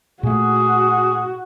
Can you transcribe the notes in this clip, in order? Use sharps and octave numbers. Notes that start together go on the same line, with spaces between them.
A#2 A3 F#4 G#4